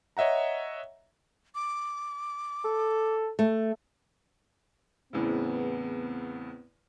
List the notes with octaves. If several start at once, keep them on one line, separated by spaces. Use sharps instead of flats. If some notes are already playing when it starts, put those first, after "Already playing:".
C#5 D#5 E5 F#5 A#5
D6
A4
A3
E2 A2 C#3 B3 C4